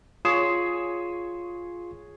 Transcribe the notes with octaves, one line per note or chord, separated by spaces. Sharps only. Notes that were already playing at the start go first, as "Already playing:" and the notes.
F4 G#4 C#5 C6 D#6 C7 E7